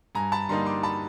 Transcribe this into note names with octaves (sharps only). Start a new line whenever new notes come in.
G2 G#5 A#5
A5 B5
D3 G3 A#3 D#4 A#5 C6
C6 D6
A5 B5